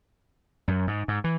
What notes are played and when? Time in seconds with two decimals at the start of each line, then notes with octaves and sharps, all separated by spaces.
0.68 F#2
0.87 G#2
1.08 G#2
1.24 E3